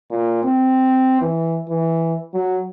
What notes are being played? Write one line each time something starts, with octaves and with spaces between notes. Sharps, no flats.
A#2
C4
E3
E3
F#3